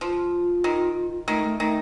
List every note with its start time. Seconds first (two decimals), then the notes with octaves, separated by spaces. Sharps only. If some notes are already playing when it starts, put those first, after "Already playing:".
0.01 F3 F4
0.64 D#3
1.27 D#3 A3
1.43 A3
1.59 D#3 A3